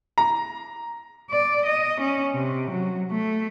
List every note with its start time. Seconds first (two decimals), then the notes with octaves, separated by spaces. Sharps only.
0.18 A#5
1.30 D5
1.66 D#5
2.01 C#4
2.34 C3
2.71 F#3
3.11 A3